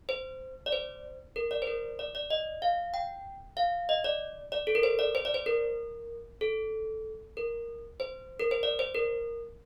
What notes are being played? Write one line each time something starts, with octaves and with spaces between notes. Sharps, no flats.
C5
D5
C5
A#4
D5
C5
A#4
D5
D5
D#5
F5
G5
F5
D#5
D5
D5
A4
A#4
C5
D5
C5
D5
C5
A#4
A4
A#4
C5
A#4
C5
D5
C5
A#4